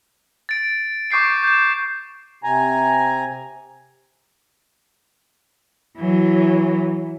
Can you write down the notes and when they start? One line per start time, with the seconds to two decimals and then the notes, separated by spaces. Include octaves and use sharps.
0.49 A6 D7
1.11 C#6 D6 G6 C7 D7
1.43 G6 E7
2.44 C3 G#5 A#5
5.98 E3 F#3